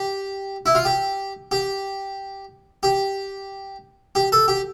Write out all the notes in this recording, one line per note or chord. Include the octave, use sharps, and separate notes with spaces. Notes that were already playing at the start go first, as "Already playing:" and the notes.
Already playing: G4
E4
F4
G4
G4
G4
G4
A4
G4